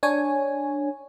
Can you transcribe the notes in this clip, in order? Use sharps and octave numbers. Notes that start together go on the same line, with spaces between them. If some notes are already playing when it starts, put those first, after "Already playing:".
D4 C#5 G#5